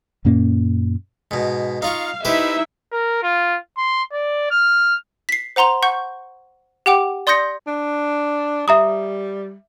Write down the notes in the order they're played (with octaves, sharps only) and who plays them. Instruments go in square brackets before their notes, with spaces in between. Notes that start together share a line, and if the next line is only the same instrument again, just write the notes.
[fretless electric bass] F#2 A#2 A#3 C#4
[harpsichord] G#2 B2
[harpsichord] D#4 F4 C#6 [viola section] F5
[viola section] D#4 E4 E5 [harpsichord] G4 B4 C5
[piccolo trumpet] A#4
F4
C6
D5
F6
[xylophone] B6 C7
C5 F#5 A#5 C6 F7
F#5 C#6 G6
G4 F#5 G5 D6
D5 C6 D#6 G6 A#6 C#7
[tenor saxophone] D4
[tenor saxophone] G3 [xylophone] E5 A#5 D#6